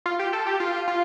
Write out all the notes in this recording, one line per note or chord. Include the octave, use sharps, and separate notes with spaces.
F4
G4
A4
G4
F4
F4